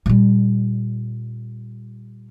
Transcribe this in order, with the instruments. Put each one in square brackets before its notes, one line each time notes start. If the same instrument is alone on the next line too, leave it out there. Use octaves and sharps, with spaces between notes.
[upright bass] A#2 G3